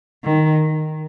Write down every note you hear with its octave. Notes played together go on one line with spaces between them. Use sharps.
D#3